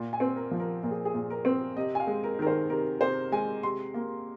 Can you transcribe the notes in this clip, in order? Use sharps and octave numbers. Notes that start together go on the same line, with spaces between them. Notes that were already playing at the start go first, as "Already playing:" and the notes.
Already playing: A#2
G#5
C4
A#4
F3
A#4
A#2 A#4
G#4
G#4
A#2
A#4
C4
C3 D#5
G#5
F5
G#3
A#4
D#3 A#4
C5
C3 A#4
C3 C5
G#3 G#5
C3 C6
A#3